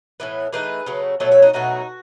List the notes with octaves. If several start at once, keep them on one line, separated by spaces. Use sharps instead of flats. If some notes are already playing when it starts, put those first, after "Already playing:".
A2 E3 B3
E3 A3 D#4 G#4 B4
C#3 F#3 A3
B2 F#3 A3 A4 C#5
C#5 E5
D#4 F#4
B2 F#3 A3 D#4 F#4